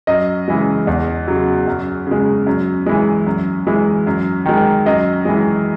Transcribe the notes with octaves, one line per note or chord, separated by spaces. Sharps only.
F#2 D#5
C#3 E3 G#3
E2
C#3 F#3
F#2
C#3 G#3
F#2
E3 G#3
F#2
E3 G#3
F#2
D#3 G#3
F#2 D#5
E3 G#3